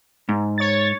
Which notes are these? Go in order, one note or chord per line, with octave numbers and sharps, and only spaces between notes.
G#2
C#5 A6